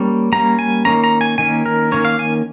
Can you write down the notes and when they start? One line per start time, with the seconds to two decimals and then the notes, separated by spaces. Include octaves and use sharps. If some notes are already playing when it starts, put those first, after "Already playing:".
Already playing: G3 A#3 C#4
0.32 G3 A#3 C#4 A#5
0.59 G#5
0.85 D#3 A#3 C#4 A#5
1.04 A#5
1.21 G#5
1.38 D#3 A#3 C#4 G#5
1.66 A#4
1.92 D#3 A#3 C#4 C#5
2.05 F5
2.19 G#5